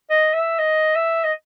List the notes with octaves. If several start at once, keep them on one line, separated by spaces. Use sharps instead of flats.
D#5
E5
D#5
E5
D#5